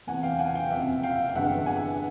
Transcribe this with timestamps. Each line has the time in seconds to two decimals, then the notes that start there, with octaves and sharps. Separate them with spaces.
0.07 E2 C3 E3 F#5 G#5
0.23 F5 G5
0.39 F#5 G#5
0.55 F5 G5
0.71 F#1 F2 C3 E5 F#5
1.03 F5 G5
1.29 G5
1.35 G1 G2 E3 G#3 E5 F#5
1.66 F#5 G#5